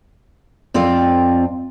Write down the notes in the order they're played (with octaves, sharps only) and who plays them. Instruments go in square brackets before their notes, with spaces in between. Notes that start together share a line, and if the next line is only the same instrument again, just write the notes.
[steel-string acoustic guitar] F2 C4 F4 D5